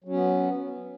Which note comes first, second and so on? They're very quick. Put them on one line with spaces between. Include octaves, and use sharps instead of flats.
F#3 C#4 B3